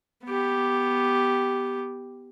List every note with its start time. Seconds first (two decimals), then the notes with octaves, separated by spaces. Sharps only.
0.25 B3 G4